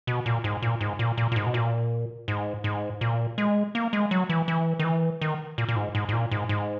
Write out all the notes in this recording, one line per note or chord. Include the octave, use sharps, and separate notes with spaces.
B2
A#2
G#2
A#2
G#2
A#2
A#2
A#2
G#2
B2
A#2
G#2
G#2
A#2
G#3
A#3
G#3
F#3
E3
E3
D#3
E3
D#3
A#2
A#2
G#2
G#2
G#2
A#2
G#2
G#2